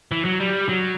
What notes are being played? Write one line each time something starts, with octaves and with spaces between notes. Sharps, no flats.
E3
F#3
G3
F#3